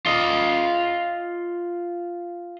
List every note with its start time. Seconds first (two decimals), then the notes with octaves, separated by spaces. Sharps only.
0.06 F4 D#5